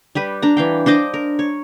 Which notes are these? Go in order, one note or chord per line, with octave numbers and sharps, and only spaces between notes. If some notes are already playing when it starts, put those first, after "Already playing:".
G3 G4 B4
D4 A#5
E3 F5 G5
D4 C5 D#5 D6
A#4
C#5